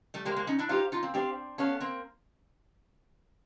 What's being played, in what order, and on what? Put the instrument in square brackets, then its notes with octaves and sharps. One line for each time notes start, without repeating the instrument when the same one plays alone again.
[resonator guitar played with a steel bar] G3 A3
[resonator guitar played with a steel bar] G#3 A#3 [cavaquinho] G4 C5 F5
[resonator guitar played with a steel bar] G#3 A#3
C#4 D#4
D4 E4
[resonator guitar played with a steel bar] D#4 F4 [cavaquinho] G4 C5 F5
[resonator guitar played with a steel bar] D#4 F4
A#3 C4
[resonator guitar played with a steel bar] C4 D4 [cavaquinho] G4 C5 F5
[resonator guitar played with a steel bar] B3 C#4 [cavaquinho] A4 C#5 F5
[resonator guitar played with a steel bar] A#3 C4